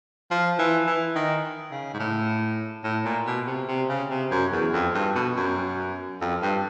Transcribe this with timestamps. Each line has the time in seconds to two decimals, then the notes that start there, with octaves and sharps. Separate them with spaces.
0.31 F3
0.59 E3
0.87 E3
1.15 D#3
1.71 C#3
1.94 G#2
1.99 A2
2.84 A2
3.05 A#2
3.26 B2
3.47 C3
3.68 C3
3.89 C#3
4.10 C3
4.31 F#2
4.52 E2
4.73 F2
4.95 G2
5.15 B2
5.36 F#2
6.21 F2
6.42 G2